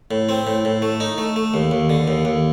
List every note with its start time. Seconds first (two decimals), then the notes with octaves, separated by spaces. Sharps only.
0.11 A2
0.29 C4
0.47 A2
0.65 A2
0.82 A3
1.00 D#4
1.18 A3
1.36 A3
1.54 D#2
1.71 D#2
1.90 D3
2.08 D#2
2.25 D#2